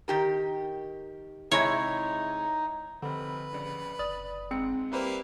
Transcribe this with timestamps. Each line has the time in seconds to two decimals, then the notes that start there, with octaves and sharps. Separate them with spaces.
0.08 D#3 G4 A#4
1.51 C3 G#3 D#4 E4 C#5
3.02 F1 D3 C4 B4
3.53 A#1 C#3
3.99 F#1 D5 D#6
4.51 G#2 G#3 C4 C#7
4.92 G3 A#3 E4 B4 C5